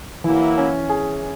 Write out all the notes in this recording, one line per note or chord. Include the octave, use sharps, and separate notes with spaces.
E3 F#3 A#3 E4
C#4
G#4